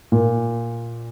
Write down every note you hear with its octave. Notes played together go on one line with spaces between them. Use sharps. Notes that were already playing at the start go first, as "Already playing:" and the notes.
A#2